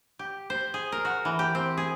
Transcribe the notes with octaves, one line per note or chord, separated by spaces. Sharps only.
G4
C5
G#4
A#4
F#4
E3
G4
C4
G#4